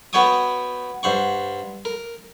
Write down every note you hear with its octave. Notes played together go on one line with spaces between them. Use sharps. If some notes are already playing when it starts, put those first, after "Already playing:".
B3 F#4 C#5 G5 C#6 D#6
G2 C5 F#5 C#6
A#4